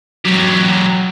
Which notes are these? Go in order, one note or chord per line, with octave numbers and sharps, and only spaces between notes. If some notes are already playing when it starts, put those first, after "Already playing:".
F#3 G4